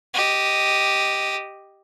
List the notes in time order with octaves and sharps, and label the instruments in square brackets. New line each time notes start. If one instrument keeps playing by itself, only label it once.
[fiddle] G4 D#5